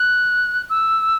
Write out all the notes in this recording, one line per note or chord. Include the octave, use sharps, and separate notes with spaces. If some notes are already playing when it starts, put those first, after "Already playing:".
Already playing: F#6
E6